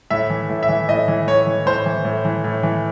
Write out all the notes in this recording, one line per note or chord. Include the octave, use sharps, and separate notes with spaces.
A2 E5
E3
A2
E5
E3
A2 D#5
E3
A2 C#5
E3
A2 C5
E3
A2
E3
A2
E3